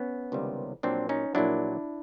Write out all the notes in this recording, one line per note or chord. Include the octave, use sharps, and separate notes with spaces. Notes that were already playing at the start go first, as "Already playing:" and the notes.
Already playing: B3 C#4
C#2 C3 D#3 G3
A#1 A#2 F#3 C4 D4
C#4 D#4
A#1 A#2 F#3 D4 E4